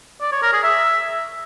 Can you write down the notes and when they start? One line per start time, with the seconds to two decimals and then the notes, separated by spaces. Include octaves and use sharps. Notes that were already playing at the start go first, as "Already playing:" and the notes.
0.21 D5
0.32 C#5
0.43 A#4
0.53 G#4
0.64 E5